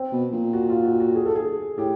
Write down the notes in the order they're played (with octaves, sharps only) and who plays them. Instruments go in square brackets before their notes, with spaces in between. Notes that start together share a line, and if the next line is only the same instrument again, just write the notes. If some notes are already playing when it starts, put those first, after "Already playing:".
Already playing: [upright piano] C4
[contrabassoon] B2
A#2
[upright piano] F#4
F4
F#4
F#4
G#4
A4
G#4
[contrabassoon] A2 [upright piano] G4